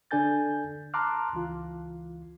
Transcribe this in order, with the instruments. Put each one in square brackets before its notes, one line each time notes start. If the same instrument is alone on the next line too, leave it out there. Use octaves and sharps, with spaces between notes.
[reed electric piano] D3 D4 A4 G#5 G6 A6
A5 A#5 C6 D6 F6 F#6
C#2 E3 F4